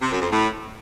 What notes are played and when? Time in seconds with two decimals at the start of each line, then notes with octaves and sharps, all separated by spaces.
0.02 C3
0.12 F#2
0.22 F2
0.32 A2